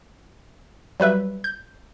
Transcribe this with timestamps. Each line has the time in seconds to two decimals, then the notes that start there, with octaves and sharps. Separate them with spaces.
1.00 F#3 G3 B4 E5
1.44 G6